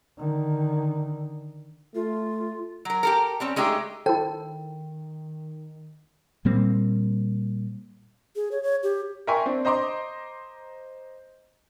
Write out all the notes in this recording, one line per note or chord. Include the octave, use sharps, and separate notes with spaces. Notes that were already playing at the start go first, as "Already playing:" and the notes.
D3 D#3
A3 F4
F#3 A#4
G4 A4 A#4
G3 C4 C#4
G#3 A3 D#4 G4 G#4
D#3 E4 A4 C5 G5
A#2 G3 A#3 C4
G#4
C#5
C#5
G4
A#4 E5 G5 G#5 C6 C#6
C4 D4
C5 D#5 A#5 C6 D6